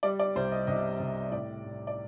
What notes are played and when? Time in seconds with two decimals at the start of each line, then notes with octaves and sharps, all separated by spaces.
0.03 G3 D5
0.19 D5
0.36 C2 C5
0.52 D#5
0.67 C3 D#5
1.00 C3
1.31 A2 D5
1.64 A2
1.87 D5